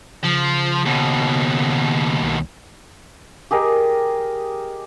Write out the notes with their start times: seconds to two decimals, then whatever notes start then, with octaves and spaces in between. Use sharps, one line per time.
0.23 C#3 F3
0.86 D#2 B2
2.22 C2
3.51 G4 G#4 A#4 D#5